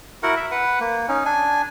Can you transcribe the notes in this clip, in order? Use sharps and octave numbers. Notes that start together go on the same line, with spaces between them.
E4 F#4 A#4 F#5
E5
B4 F#5
A#3
C#4 D#4
D4 G#5